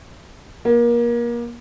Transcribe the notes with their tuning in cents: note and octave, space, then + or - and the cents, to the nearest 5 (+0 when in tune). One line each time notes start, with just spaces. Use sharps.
A#3 +30